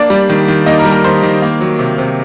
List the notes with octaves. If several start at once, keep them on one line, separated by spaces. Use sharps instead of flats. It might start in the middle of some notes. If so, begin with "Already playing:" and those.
Already playing: A#3 D4 D5
G3
D#3
D#3
A#3 D#4 D#5
A#4 A#5
G3
A#4 A#5
D#3 C5 C6
D#3
A#3
F#3
C3
C3